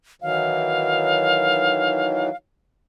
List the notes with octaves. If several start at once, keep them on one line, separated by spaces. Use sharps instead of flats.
D#3 E3 F#3 F5